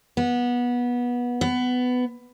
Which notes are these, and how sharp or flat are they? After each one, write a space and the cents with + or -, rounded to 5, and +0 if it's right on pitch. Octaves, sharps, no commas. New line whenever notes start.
B3 -20
B3 +15